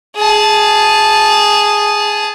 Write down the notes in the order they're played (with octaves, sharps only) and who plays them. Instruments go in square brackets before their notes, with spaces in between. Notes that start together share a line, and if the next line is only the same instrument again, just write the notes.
[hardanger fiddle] G#4 A5